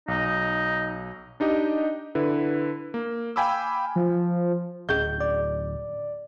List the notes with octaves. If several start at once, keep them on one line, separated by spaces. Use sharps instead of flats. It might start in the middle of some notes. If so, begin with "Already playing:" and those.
B1 D#4
D4 D#4 G4 D#5
D3 E4 B4
A#3
F5 G5 G#5 B5 D6 E6
F3
D1 C#4 G#4 D#5 G6
D5